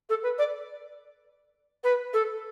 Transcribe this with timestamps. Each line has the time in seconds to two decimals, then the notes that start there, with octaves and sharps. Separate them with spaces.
0.09 A4
0.22 B4
0.38 D5
1.83 B4
2.13 A4